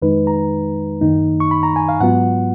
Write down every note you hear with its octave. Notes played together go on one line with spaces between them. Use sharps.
F2 D#3 G#3 D#4 B4
A#5
F#2 D#3 A#3 D#4
C#6
B5
A#5
G#5
F5
G#2 F#3 B3 F4 F#5